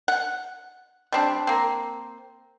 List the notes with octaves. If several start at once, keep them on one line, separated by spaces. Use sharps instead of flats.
F#5
G3 C4 D4
A#3 C4